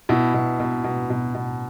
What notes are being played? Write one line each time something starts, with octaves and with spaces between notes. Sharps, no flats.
B2 E4
B2
B2
B2
B2
B2